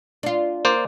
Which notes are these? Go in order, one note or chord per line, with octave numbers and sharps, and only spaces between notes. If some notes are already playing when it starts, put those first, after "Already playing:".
D4 F4
A#3 C5 D5